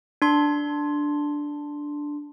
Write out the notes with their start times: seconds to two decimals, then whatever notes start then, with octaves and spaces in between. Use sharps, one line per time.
0.22 D4 C6